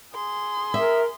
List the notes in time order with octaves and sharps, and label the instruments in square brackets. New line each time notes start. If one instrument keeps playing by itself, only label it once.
[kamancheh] G#4 C6
[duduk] A#4 [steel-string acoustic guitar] E5